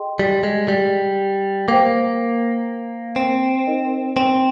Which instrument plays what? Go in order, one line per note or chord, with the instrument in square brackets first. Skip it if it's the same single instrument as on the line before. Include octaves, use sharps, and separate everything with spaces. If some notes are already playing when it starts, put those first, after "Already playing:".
Already playing: [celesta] G#4 D#5 G5 C6
[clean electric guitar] G3
G#3
G3
[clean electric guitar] A#3 [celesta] C5 G5 D6
[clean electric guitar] C4
[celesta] D#4 A#4 D#5
[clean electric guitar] C4